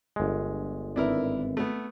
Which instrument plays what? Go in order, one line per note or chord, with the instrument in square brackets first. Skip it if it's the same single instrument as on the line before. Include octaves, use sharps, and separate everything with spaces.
[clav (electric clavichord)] G1 G#3
[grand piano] G#1 B4 E5 [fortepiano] D4 E4 A#4
[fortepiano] A3 B3